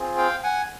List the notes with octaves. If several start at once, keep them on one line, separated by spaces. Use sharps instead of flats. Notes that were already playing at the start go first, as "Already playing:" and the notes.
Already playing: C4 F4 G#4
F5 G5
F#5 G#5